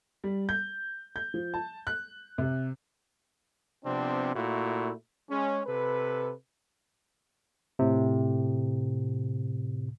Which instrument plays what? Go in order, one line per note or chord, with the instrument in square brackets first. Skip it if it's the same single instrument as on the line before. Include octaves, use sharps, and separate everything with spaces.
[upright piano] G3
G6
G6
F3
A5
F#6
C3
[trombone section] C3 F3 B3 C4 D4
A#2 A3 A#3 E4 F#4
G#3 C#4
C3 A4 B4
[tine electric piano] A2 C3